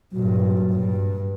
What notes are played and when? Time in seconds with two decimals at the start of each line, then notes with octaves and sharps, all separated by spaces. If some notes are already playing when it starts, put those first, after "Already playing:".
0.13 G2 A#2 F#3
0.72 G2